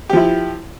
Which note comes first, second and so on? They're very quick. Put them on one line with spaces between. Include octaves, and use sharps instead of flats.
G4 F3 E4